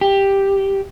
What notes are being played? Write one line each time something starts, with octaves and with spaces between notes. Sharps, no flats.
G4